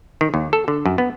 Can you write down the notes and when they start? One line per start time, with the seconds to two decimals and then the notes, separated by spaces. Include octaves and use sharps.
0.21 D#3
0.34 D#2
0.53 A4
0.68 D3
0.86 F#2
0.98 B3